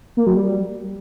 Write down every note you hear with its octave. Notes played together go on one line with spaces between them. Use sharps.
A#3
F#3
G3